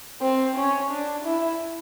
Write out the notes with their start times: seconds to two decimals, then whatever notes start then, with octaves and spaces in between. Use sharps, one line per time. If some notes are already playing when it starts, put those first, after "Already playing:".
0.21 C4
0.56 C#4
0.91 D4
1.25 E4